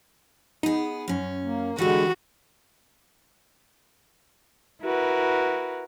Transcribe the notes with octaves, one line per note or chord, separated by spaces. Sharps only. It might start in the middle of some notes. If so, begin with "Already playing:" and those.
B3 D#4 G#4
F#2 C#4
A#3
D3 E3 G#3 F#4 G4
E4 F#4 A#4 B4